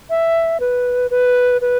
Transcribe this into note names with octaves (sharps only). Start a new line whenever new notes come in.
E5
B4
B4
B4